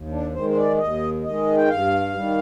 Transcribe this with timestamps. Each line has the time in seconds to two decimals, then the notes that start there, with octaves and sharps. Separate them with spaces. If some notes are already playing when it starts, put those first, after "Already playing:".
Already playing: D#2
0.11 D4
0.34 D#3 G#3 C5
0.50 C5
0.57 D5
0.78 D#2 D#5
1.24 D#3 G#3 D#5
1.57 G5
1.68 G2 F5
2.14 D#3 G3